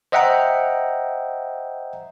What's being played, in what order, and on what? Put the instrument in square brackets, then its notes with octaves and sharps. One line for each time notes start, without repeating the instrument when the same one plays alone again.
[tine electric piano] C5 D#5 E5 F#5 G5 A#5